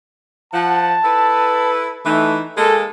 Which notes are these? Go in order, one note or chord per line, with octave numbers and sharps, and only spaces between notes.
F3 F#5 A5
E4 A4 B4
E3 A3 D#4
G#3 A#3 A4